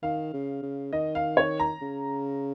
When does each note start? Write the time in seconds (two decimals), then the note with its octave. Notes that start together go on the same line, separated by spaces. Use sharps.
0.03 D#3 F5
0.33 C#3
0.62 C#3
0.93 D#3 D#5
1.15 F5
1.37 C#5
1.60 A#5
1.82 C#3